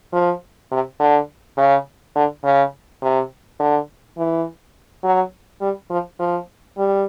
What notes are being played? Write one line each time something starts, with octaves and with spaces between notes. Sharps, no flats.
F3
C3
D3
C#3
D3
C#3
C3
D3
E3
F#3
G3
F3
F3
G3